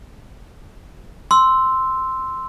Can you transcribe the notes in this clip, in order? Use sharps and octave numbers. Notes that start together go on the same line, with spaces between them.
C6 E6